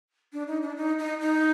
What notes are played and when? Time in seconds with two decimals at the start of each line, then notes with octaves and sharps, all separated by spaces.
0.33 D4
0.48 D#4
0.62 D4
0.77 D#4
0.99 D#4
1.21 D#4